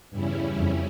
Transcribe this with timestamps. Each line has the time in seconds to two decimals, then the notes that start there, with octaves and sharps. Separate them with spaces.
0.12 E2 G2 C#3 G3 C#4 E4
0.58 F2